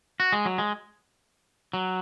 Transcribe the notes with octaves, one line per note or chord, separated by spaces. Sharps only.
F#4
G#3
F#3
G#3
F#3